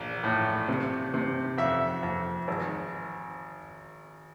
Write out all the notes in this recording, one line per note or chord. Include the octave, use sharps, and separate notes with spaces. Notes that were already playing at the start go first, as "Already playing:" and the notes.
Already playing: A#1
A2
C3
C3
F2 E5
F2
G#1